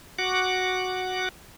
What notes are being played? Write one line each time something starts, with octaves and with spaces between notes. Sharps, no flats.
F#4 F#5 D6